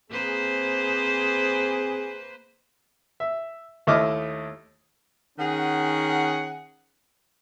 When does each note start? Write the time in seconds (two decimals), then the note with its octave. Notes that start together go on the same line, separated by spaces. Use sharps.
0.11 A#3 C4 G#4 B4 C5
3.20 E5
3.87 D#2 A3 E4 D#5 D6 F6
5.38 D#3 C#4 G#4 F#5